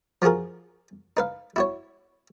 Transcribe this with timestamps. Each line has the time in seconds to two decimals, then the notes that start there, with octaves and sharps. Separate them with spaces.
0.22 F3 F4 F#4 G#4 A#4
1.17 D#4 B4 F5
1.56 E4 F#4 C#5